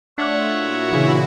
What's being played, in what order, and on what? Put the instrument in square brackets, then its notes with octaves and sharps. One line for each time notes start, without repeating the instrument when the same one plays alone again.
[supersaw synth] A3 F4 [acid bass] D4 [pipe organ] C#5 E5 F#5
[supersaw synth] A#2 E4 F#4
[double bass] C#3 E3